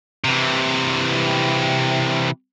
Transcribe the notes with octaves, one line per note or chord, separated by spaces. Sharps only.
C3 E3